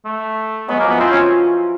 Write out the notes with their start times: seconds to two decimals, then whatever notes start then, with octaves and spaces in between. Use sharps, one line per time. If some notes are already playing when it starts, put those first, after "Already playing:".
0.05 A3
0.68 F#3 G#3 B3
0.79 F3 A#3
0.89 E3 B3
1.00 F3 C4
1.11 C#4